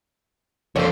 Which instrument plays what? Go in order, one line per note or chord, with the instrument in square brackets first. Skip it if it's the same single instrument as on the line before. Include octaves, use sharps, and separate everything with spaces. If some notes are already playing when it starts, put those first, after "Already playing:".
[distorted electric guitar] F2 D3 [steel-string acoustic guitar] C5 C#5